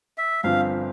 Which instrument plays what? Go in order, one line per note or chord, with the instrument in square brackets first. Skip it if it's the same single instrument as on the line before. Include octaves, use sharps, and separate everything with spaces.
[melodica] E5
[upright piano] G1 G2 F3 C4 F4 [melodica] F5